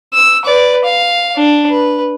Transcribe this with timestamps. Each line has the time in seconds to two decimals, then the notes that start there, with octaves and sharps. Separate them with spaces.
0.14 E6
0.44 B4 D5
0.84 F5
1.36 D4
1.69 B4